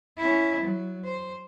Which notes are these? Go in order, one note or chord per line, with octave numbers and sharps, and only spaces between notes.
C#4 E4
F#3
C5